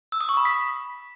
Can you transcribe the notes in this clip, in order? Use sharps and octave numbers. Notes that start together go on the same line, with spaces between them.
E6
D#6
C#6
B5
B6